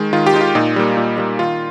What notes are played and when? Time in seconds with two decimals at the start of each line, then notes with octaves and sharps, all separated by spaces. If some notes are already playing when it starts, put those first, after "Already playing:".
Already playing: D#3 G#3
0.13 D#3 F4
0.26 G4
0.34 G#3 D#4
0.41 F4
0.55 A#2 D#4
0.76 G3 A#3
0.97 A#2
1.18 G3 A#3
1.39 D#3 F4